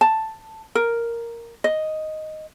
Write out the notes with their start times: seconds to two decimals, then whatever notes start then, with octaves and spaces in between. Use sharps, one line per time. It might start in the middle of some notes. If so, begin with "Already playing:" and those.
0.01 A5
0.75 A#4
1.64 D#5